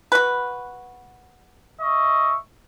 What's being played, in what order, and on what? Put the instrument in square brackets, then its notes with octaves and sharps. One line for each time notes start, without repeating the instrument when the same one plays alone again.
[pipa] F#4 B4
[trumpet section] D#5 E5 C#6